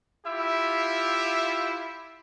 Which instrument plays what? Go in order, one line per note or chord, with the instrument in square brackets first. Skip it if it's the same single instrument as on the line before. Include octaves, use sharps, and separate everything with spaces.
[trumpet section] E4 F4 G4 E5